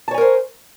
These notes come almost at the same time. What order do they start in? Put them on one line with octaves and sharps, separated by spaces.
A5 C#5 G#5 A#4 C5